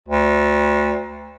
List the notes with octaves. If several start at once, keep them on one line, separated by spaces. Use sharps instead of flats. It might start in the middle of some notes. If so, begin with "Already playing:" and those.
D2